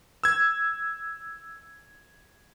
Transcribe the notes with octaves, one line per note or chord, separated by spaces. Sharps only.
E6 G#6